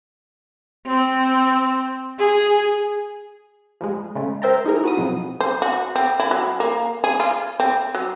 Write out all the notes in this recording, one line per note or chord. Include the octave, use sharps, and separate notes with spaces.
C4
G#4
F3 G3 G#3
C#3 G#3 A3
A#4 C5 E5 G5 A5 A#5
A#3 D#4 E4 G#4 A#4
F#4 B4 D#6
F2 B2 F3 F#3 C4
C5
F#4
C4
E4
F#3
A#3
G#4
F4
C4
F#3